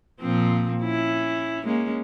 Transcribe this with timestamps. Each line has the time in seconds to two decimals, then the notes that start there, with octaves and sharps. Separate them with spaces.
0.21 A#2 F3 C4
0.83 C#4 E4
1.65 G#3 A#3 C#4